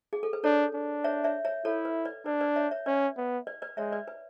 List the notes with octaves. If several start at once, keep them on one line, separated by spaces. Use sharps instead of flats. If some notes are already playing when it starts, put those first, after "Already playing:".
G#4
A4
B4
D4 A4 C#5
D4
C#5 E5
C#5 E5
C#5 E5
E4 A4 C#5
B4
B4 D5
D4 B4 D5
B4 D5
C#5 E5
C#5 E5
C#4 B4 D5
B3
B4 D5
B4 D5
G#3 C#5 E5
B4 D5
B4